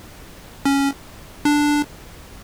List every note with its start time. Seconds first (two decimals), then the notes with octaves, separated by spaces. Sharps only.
0.65 C#4
1.45 D4